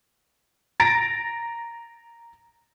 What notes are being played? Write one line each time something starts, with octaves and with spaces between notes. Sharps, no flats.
A#5 A6 A#6 D7